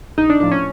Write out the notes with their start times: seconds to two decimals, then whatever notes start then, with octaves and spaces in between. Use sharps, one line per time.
0.18 A#1 D#4
0.30 D4
0.40 A2 F3 D4
0.51 C#4